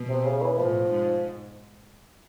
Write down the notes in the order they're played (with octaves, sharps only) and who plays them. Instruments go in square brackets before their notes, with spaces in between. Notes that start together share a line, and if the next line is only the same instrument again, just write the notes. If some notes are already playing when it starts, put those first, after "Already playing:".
Already playing: [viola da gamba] B2
[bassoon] C3
C#3
E3
[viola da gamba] A2 [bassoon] F3
[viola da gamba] G#2